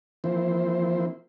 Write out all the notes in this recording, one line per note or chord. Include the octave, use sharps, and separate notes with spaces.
E3 F3 A#3 C4 E4 C5